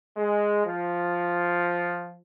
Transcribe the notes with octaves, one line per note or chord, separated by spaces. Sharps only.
G#3
F3